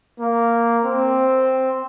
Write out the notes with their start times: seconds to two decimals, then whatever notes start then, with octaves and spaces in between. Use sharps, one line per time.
0.20 A#3
0.85 C4